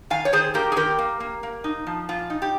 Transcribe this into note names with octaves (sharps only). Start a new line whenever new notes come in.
D#3 F5 G#5
C#5
D#3 G#4 C5
A#3 G4 A#4
G#4
D#3 G4 A#4
A#3
A#3
A#3
D#4
F3
A#2 F4
D#4
G4